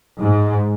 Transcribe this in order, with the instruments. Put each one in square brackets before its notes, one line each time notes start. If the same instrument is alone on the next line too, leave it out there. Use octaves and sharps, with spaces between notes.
[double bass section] G#2